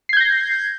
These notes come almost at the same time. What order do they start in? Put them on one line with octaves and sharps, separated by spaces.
C7 G#6 G6 A#6